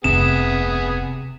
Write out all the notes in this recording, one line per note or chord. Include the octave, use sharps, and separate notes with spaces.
F1 D2 C3 B3 G#4 E7